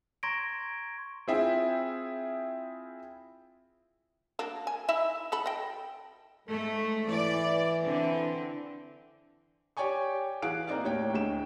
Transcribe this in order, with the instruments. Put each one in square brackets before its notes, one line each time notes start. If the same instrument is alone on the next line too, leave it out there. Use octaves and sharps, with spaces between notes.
[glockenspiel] A#5 C6 C#6 G#6 A#6 D7
[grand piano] C4 E4 F4 G#4 E5 G5
[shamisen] F#3 A#3 D4
G#5
D#4 E4 E5
F#3 A4 B5
D#5 G5
[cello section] G#2 A3 [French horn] A4
[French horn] E3 [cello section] D5
[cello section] D3 C4
[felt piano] G4 C#5 D5 G5 G#5 C#6
E3 F#4 G#4 F5 F#6 D7
A#3 C4 D#4 D5 F5
D#2 A2 C#5 G5
D2 G#3 G5 E7